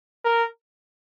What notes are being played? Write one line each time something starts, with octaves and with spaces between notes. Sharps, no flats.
A#4